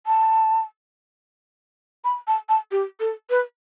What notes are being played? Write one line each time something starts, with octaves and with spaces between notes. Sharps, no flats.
A5
B5
A5
A5
G4
A4
B4